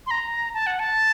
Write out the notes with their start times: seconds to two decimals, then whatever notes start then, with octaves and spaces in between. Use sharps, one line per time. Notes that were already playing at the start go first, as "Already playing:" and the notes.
0.07 C6
0.11 A#5
0.54 A5
0.67 F#5
0.79 A5